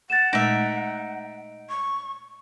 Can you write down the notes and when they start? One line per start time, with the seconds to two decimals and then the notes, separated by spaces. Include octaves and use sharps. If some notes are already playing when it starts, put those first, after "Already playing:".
0.10 F#5 A6 E7
0.33 A#2 G#3 A3 D#4 E5 D7
1.69 C#6